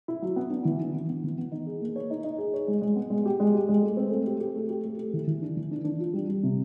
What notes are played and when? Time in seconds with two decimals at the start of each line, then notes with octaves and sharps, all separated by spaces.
0.08 E4
0.22 F#3
0.36 B3
0.50 D4
0.65 E3
0.80 D4
0.95 B3
1.09 B3
1.24 E3
1.38 B3
1.52 D#4
1.67 G#4
1.81 A#3
1.96 C#5
2.10 D#4
2.24 D#4
2.38 G#4
2.54 C#5
2.68 G#3
2.81 G#3
2.96 B3
3.10 G#3
3.26 G4
3.40 G#3
3.54 G4
3.68 G#3
3.82 A3
3.97 C4
4.12 A3
4.27 G4
4.40 G4
4.55 A3
4.70 G4
4.84 A3
4.98 A3
5.13 E3
5.27 E3
5.42 D4
5.57 E3
5.71 D4
5.85 D4
6.00 F4
6.13 G3
6.29 G3
6.43 C3